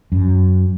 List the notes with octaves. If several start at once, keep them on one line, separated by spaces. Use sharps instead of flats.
F#2